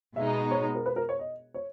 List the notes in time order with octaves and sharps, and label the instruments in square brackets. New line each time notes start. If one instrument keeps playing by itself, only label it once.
[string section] B2 G#3 B3 D#4 [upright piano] E5
[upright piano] C#5
A#4
B4
A#4
C#5
D#5
C#5